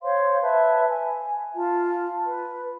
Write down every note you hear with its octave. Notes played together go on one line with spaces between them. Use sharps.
C5 C#5 F5 C6
B4 E5 A5
G#5
F4 A5
B4